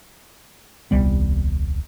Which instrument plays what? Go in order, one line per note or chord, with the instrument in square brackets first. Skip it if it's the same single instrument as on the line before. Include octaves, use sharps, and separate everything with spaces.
[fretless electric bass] D#1 C2 G3 B3